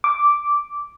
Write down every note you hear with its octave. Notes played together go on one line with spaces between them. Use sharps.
D6